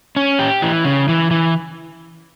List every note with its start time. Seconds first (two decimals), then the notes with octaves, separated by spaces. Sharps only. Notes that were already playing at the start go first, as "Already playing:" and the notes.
0.16 C#4
0.39 G4
0.62 E3
0.85 C#3
1.08 E3
1.31 E3